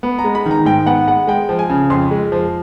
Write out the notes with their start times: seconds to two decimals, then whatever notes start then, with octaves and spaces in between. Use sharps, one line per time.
0.03 B3
0.19 A#5
0.24 G#3
0.35 B5
0.46 D#3
0.51 A#5
0.65 G#2 G5
0.86 B3 F#5
1.07 G#3 F#5
1.27 G#3 G5
1.49 F3
1.59 G#5
1.69 C#3
1.90 F2 C6
2.11 G#3
2.32 F3